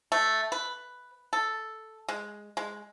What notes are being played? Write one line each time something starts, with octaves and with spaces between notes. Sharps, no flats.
A3
B4
A4
G#3
G#3